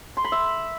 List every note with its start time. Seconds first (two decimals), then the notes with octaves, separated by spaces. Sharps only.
0.17 C6
0.24 B5
0.32 E5